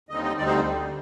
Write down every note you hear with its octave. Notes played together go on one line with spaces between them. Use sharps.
D#2 D3 G3 C4 D#4 D#5
D#5
D2 D3 G3 C4 D#4 D5
C5